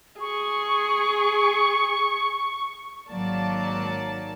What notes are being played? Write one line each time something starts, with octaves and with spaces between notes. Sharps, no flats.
G#4 C#6
G#1 G#2 F#3 A#3 D5 A5